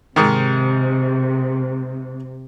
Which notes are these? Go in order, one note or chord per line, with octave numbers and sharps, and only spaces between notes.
G#2 C3 D#3